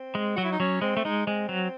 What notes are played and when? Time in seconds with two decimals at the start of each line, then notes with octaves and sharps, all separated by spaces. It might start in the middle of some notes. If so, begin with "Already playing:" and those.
Already playing: C4
0.15 G#3
0.36 F#3 F#4
0.44 E4
0.52 D#4
0.60 F#3 C#4
0.82 G#3 C4
0.97 A3
1.05 G#3 D#4
1.27 G#3 C4
1.49 F#3